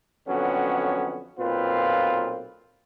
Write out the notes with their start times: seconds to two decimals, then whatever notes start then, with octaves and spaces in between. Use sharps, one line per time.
0.28 F2 D3 F#3 B3 C#4
1.38 B1 A#2 C4 F4 B4